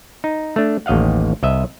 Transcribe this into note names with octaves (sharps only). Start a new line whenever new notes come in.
D#4
A3 D4
A1 D#2 D#5 F5 F#5
C2 D#5 E5